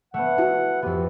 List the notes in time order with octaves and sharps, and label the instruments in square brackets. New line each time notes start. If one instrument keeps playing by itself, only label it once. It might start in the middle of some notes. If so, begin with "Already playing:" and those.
[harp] A3 B3 [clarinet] F#5
[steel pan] E4 F#4
[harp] F2 B3 [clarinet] G4